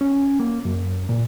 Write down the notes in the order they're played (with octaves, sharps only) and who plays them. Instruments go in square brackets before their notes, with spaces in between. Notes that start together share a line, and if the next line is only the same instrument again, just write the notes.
[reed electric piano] C#4
A#3
F#2
A#2